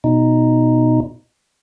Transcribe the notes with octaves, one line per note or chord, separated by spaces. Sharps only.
B2 D#4